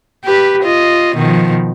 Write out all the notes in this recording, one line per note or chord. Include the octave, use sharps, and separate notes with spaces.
G4 B4
F4 D#5
B2 D#3 F3